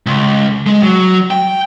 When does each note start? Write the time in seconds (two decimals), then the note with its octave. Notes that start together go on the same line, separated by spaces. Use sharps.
0.07 C#2
0.67 G#3
0.83 F#3
1.31 G5